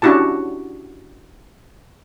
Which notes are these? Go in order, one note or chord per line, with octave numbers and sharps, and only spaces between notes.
C#4 D4 E4 F#4 G4 A5